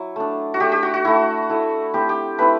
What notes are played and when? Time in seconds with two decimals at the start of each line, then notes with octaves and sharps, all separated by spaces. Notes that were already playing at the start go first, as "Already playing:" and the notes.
Already playing: F#3 E4
0.16 A3 D4
0.54 F#4
0.60 A3 D4 G4
0.72 G4
0.83 F#4
0.94 F#4
1.05 A3 E4 F#4
1.50 A3 E4
1.94 A3 C4 E4 G4
2.09 G4
2.38 A3 C4 E4 B4